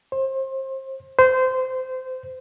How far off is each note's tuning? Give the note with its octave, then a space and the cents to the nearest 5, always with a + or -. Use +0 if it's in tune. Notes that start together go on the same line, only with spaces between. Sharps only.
C5 +30
C5 -20